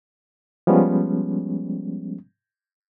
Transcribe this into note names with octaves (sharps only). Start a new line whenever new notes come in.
F3 G3 G#3 B3 C#4